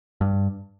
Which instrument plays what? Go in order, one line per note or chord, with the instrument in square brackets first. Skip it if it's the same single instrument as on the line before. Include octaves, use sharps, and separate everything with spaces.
[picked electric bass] G2